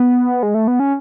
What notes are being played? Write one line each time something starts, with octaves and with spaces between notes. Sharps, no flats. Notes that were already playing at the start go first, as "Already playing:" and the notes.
Already playing: B3
G#3
A3
B3
C#4